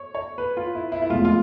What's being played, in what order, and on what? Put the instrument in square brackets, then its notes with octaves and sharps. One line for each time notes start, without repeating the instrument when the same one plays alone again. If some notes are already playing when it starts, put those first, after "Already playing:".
Already playing: [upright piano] C#5
C#5
B4
F4
E4
E4
E4
[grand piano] F1 E2 B2 G#3 [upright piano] F4
[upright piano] F4